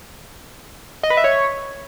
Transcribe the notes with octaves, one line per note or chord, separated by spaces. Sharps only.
D#5
B4
E5
C#5